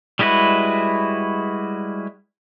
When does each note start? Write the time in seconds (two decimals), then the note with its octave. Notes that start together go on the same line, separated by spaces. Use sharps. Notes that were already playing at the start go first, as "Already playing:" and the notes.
0.19 G3 G#3 E4 F#4 B4